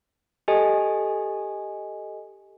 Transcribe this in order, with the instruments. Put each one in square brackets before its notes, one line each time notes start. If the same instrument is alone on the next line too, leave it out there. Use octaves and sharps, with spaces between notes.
[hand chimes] G4 A4 D#5 G#5